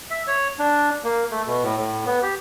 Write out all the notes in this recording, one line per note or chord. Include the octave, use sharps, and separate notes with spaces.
E5
C#5
D4
A#3
A3
B2
A2
A2
B3
G4